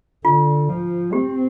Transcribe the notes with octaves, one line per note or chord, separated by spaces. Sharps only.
D3 F4
F3
C4 G4